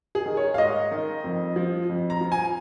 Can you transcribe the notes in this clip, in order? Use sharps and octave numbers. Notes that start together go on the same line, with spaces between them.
G#4
D#3
C#5
F5
G#2 D#5
D#3
F2
F3
F2
A#5
F3
G#5